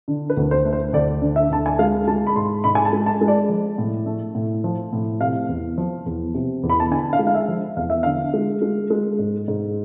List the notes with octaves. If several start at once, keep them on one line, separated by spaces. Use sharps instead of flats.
D3
B4
D2
C5
A3
C5
D2 D5
D3
E5
D2 A5
G#5
G#3 F5
G#3 A5
B5
G#2 C6
G#2 B5
G#5
A5
G#3
A5
G#3
D5
F3
A2
A3
A2
F3
A2
C3 F5
E2
F3
E2
C3
E2
B5
A5
D3 G#5
F5
G#3
F5
E5
F3
E2 F5
E5
D3 F5
G#3
G#3
G#3
G#2
G#2